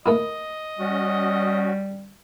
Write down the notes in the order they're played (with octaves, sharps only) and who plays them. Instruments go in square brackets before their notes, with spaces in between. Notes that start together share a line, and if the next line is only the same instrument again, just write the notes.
[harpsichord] A3 A#3 E4 [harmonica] D#5
[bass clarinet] G3 [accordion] C#4 F#4